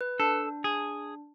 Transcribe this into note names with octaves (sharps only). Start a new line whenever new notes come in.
B4
D4 A4
G#4